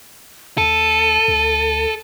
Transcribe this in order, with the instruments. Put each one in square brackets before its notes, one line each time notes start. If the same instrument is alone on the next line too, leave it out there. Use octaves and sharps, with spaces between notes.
[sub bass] D#2 [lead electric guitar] A4 [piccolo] D#7
[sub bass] D2